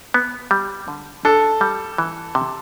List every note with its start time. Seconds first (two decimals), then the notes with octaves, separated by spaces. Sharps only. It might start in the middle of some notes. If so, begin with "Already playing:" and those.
0.14 B3
0.51 G3
0.88 D3
1.25 D4 A4
1.61 G3
1.98 E3
2.35 C3